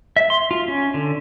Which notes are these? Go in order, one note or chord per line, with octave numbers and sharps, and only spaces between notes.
E5
C6
F4
C#4
D3